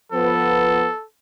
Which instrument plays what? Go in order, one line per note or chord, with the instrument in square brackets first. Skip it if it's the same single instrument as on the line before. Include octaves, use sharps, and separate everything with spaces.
[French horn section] F3 B3 [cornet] A4